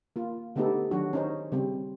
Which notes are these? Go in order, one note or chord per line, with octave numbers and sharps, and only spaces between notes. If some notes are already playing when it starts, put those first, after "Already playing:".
A#3 F4
D3 A3 B3 D#4 G4 A4
D#3 F#3 D4 F#4
C#4 D#4 C5
C#3 G3 C4